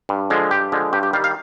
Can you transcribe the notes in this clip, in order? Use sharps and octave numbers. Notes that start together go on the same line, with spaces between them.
G2
D3 F3 G#3
G2 G4
D3 F3 G#3
G2 G4
G4
D#3 G3 F5
F5